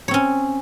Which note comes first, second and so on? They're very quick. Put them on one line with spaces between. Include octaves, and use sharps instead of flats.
C#5 C4 C#4